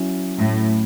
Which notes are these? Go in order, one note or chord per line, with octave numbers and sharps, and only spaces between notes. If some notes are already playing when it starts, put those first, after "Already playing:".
Already playing: F#3 C#4 E4
A2